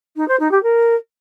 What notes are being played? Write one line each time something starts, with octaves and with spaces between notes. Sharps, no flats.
D#4
C5
D#4
G4
A#4